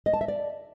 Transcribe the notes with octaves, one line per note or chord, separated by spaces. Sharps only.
D#5
A5
E5
D5